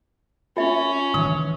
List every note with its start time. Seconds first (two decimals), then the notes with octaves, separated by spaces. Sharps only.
0.57 C#4 F4 E5
1.14 D#3 E3